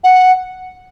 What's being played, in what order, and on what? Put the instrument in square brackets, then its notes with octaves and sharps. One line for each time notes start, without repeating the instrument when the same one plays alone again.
[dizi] F#5